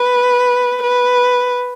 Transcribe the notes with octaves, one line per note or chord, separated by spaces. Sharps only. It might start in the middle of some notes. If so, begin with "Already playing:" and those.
Already playing: B4
B4